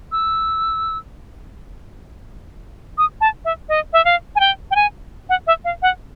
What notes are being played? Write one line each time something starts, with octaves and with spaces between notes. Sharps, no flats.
E6
D#6
A5
E5
D#5
E5
F5
G#5
G5
G5
G#5
F#5
E5
F5
F#5